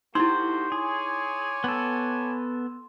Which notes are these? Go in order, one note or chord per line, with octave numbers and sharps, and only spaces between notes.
A3 D#4 E4 F#4 G4 C5 C6
G#4 C#5 G#5 D6
B3 A4